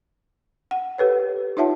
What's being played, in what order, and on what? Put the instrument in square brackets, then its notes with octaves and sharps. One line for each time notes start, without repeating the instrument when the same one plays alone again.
[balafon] F#5
G4 A4 B4 C#5
D#4 F4 C#5 E5 F#5 A5